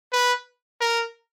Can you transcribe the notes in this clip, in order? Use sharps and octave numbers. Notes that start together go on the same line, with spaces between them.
B4
A#4